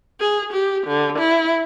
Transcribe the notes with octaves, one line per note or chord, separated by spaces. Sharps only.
G#4
G4
D3
E4